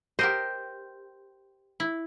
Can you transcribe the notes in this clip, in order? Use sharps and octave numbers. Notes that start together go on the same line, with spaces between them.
G4 A#4 C5 D#5
E4